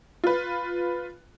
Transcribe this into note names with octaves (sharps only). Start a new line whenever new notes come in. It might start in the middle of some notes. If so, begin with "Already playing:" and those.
F4 B4